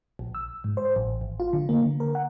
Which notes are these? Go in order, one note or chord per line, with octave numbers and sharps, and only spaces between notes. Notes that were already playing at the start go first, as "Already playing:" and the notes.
A#1
E6
G#2
C5
A1
G#1
F4
D3
A#3
D3
A#4
F#5